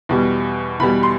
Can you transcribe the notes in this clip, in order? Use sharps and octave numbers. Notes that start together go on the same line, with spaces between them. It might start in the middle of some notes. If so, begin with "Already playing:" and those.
E2 B2 G3
E2 B2 G3 B5
C6